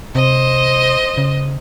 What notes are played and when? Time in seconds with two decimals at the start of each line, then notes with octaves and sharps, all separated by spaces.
0.15 C3 C5 D#5
1.18 C#3